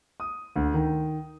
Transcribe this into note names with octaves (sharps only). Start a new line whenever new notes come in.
D#6
D2
D#3